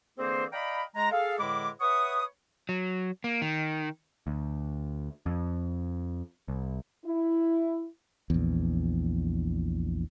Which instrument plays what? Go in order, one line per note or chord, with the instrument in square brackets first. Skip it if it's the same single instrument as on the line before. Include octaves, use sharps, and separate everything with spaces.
[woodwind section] D3 E3 A#3 C4 G#4 C5
D5 D#5 F5 G5 A#5 B5
G#3 A#5
G#4 A4 F5
E2 A2 D3 G#3 B5 D6
B4 C#5 E5 F#5 C#6 D#6
[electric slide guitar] F#3
A#3
D#3
[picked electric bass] D2
F2
C2
[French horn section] E4
[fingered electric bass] A#1 E2